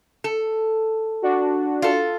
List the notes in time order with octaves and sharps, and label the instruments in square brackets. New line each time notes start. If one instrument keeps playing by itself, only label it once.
[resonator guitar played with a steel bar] A4
[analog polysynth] D4 F#4
[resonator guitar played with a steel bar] F4 A4